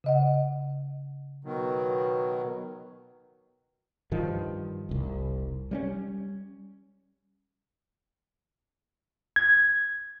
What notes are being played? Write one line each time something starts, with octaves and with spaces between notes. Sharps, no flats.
C#3 D#5 F#5
B2 D#3 F#3
G2 D#3 F3
F1 C2
G3 A#3 C#4
G#6